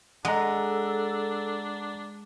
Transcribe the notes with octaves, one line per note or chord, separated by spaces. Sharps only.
G#3 D4 A4 F#5 A#5